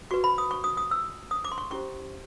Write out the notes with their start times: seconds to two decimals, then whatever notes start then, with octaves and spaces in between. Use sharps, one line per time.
0.11 F#4 B4 C#6
0.24 B5
0.38 D#6
0.51 C#6
0.64 D#6
0.77 D#6
0.91 E6
1.31 D#6
1.45 D6
1.52 C6
1.58 C#6
1.70 C#4 E4 G4 C5 C#6